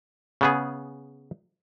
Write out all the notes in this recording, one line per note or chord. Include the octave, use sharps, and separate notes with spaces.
C#3 B3 G#4